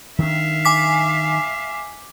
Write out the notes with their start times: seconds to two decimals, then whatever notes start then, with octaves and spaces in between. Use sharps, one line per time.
0.19 D#3 D4 E5 F5
0.65 G#5 D6 B6